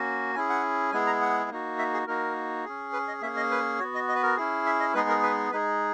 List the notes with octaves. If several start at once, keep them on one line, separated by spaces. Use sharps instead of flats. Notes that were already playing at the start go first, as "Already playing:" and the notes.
Already playing: A#3 C#4 F#4
C#4 E4 G#4 G#5
F#5
G#3 B3 E4 G#4 G#5
A#5
F#5
A#3 D#4 F#4
E5
G#4
A#3 D#4 F#4 A#4
C#4 G#4
B4
D#5
A#3 C#4 G#4 E5
D#5
B4
B3 F#4 C#5
D#5
D#5
B4
A#4
C#4 E4 G#4
E5
D#5
G#3 B3 D#4 G#4 B4
A#4
B4
G#3 D#4 G#4 B4